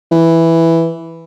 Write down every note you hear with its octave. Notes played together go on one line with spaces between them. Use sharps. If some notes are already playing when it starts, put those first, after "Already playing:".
E3